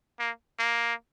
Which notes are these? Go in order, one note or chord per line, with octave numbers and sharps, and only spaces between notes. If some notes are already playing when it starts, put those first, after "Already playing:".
A#3
A#3